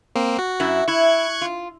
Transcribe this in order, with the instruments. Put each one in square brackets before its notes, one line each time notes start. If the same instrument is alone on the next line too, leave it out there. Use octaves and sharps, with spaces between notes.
[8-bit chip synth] A#3 C4
F#4
[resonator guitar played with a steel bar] F#2 E4
[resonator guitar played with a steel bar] E4 [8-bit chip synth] C#6 F#6 G#6
[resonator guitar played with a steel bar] F4